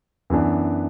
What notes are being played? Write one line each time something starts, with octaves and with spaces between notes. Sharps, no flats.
F#2 E3 B3 D4